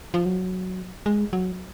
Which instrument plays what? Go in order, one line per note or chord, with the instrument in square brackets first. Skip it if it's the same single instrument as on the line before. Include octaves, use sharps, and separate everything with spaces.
[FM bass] F3
F#3
G#3
F#3